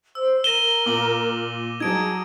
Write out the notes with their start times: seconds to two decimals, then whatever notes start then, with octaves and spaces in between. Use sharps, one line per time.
0.15 C5 E6
0.44 A#4 A#6 D#7 E7 G7
0.86 A#2 D6 F#7
1.80 F#3 D#4 G#4 A5 G#6 D7